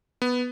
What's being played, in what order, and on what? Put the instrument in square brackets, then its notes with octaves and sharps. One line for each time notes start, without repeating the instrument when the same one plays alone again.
[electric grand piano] B3